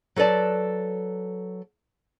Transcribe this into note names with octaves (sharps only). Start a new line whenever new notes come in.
F#3 A4 B4 D5 A5